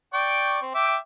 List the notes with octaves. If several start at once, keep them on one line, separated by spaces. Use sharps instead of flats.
D5 G5 C#6
C4
E5 G5 D6